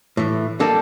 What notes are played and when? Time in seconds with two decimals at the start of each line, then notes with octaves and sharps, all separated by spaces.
0.17 A2 E3
0.60 G3 A#3 D4 A4